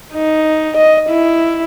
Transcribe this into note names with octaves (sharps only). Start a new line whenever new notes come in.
D#4
D#5
E4